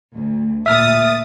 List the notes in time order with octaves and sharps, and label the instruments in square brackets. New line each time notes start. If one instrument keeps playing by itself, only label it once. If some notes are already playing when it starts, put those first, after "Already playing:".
[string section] D2
[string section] A#2 D#6 A6 [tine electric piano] E5 F6